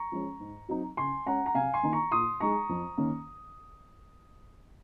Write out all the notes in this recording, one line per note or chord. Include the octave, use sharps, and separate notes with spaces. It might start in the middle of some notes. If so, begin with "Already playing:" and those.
Already playing: A#5 C#6
F3 G#3 C#4
G#2
F#3 C4 D#4
C#3 G#5 C6
G#3 C#4 F#5 A#5
A#5
C3 F5 G#5
G#5 C6
D#3 A#3 D#4
A#5 C#6
A#2 C6 D#6
G#3 D#4 A#5 C#6
F2
D#3 A#3 C#4